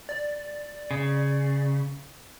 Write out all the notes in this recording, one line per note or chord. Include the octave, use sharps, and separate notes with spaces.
D5
C#3